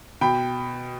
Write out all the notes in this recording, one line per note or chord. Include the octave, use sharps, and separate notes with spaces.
B2 G5 B5